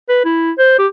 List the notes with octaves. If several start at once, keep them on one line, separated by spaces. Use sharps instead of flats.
B4
E4
C5
G4